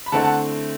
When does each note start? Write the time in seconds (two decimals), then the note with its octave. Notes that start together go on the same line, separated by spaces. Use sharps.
0.06 B5
0.12 D3 A3 C4 E4 F#5 A5
0.24 F#5 A5